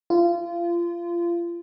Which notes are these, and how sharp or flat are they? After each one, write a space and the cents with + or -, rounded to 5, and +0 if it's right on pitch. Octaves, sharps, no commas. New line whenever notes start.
F4 -25